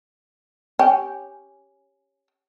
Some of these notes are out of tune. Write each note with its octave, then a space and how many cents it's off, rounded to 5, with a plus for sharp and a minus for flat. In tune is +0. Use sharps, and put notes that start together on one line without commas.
C#4 +0 G4 +0